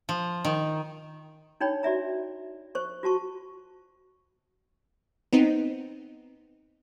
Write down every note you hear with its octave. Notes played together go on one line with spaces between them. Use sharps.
F3
D#3
D4 D#4 C#5 G5 B5
F#4 D5 E5 A#5
C5 C#6
F4 F#4 A5 C#6
B3 C4 D#4